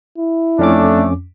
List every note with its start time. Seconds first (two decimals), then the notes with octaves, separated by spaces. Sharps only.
0.18 E4
0.59 F2 A3 C#4 D4 D6